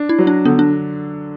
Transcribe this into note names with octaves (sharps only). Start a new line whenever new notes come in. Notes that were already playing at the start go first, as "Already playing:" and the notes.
Already playing: D4
E4
F#3
D4
D3 B3
D4